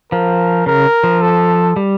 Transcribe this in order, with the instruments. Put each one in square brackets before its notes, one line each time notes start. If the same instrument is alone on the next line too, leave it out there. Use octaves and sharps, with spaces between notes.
[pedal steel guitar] F3 [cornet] A#4
[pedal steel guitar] C#3 [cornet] A#4
[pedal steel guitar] F3
[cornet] A4
[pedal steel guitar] G3